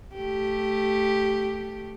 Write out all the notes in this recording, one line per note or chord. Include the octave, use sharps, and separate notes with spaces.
A3 G4